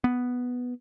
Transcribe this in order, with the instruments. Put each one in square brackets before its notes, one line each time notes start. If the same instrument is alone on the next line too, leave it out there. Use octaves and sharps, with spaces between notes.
[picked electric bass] B3